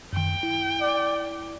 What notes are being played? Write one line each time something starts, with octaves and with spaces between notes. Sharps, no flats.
F#2 D#3 G5
E4
D5